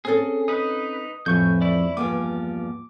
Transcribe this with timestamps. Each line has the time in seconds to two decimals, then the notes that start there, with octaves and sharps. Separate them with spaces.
0.05 C4 C#4 G#4 A4
0.48 D#4 B4 D#6
1.26 F2 A2 E3 C#6 G6
1.61 E4 D5
1.97 E2 G2 F3 A#3 D6